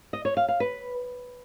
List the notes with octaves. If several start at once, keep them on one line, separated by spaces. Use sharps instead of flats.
D#5
C#5
F5
F5
B4